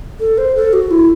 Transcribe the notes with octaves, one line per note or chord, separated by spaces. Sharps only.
A4
C5
A4
F#4
E4